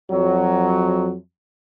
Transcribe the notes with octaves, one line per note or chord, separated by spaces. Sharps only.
F2 F#3